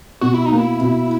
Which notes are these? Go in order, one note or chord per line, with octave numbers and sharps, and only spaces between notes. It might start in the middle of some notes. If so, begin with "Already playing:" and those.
B2 F#4
E4
D#4
A#3
E4
B2